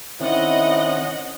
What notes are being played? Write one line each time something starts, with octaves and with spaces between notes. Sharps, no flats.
D#3 C4 C#4 E4 D#5 F#5